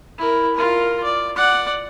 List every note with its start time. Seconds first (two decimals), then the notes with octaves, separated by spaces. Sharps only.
0.18 E4 A#4
0.55 F4 A#4
1.04 D5
1.36 D5 F#5